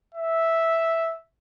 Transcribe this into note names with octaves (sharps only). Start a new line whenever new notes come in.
E5